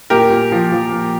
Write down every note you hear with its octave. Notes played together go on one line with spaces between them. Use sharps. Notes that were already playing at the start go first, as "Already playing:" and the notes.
A#2 G4 A#4
A#2
F3
F3
A#2